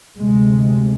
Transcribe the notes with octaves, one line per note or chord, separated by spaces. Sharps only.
D2 C3 G#3